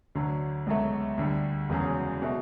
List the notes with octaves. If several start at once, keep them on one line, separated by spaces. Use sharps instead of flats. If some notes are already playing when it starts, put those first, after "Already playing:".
D2 D3 F#3
C#2 B2 F#3 A3
D2 D3 G3
E1 E2 C#3 F#3
B2 A3